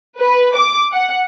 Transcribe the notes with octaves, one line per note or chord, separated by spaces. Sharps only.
B4
D6
F#5